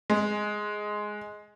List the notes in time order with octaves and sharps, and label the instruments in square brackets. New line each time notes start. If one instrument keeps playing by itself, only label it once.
[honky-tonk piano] G#3